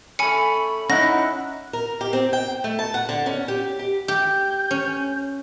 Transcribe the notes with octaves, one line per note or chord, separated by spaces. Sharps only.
A3 C#4 G#5 B5 C#7
C#4 D#4 E4 F#5 F#6 A#6
A#4
G4
C4
G5
A3
A5
F#5
D3
C#4
G4
G4
G4 G6
C#4